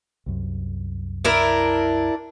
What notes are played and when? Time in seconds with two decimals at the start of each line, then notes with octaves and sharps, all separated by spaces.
0.26 C2 F#2
1.25 D4 E4 A#4